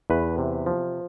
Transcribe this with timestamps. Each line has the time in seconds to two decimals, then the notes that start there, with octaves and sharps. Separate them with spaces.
0.10 E2 B4
0.38 C3
0.66 F3